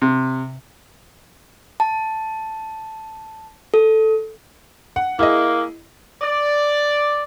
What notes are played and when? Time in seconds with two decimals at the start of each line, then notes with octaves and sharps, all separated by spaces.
0.02 C3
1.80 A5
3.74 A4
4.96 F#5
5.19 A#3 E4 G#4 D#5
6.22 D5